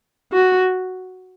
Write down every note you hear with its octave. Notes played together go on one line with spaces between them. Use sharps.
F#4